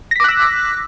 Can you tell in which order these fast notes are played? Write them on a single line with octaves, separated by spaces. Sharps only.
A#6 B6 D6 F#6 E6